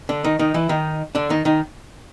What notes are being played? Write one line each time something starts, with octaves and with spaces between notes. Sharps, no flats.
D3 D4
D#3 D#4
D#3 D#4
E3 E4
D#3 D#4
D3 D4
D#3 D#4
D#3 D#4